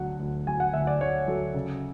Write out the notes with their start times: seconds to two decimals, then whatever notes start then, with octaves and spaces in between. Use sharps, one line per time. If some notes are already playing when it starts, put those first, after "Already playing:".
Already playing: D2 D3 F#3 F#5
0.20 D2
0.47 F#3 G#5
0.60 F#5
0.74 D2 E5
0.87 D5
1.00 D2 C#5
1.27 F#3 A4
1.54 C#3